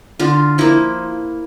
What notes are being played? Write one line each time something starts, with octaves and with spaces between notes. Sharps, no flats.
D3 F4
F3 A#3 E4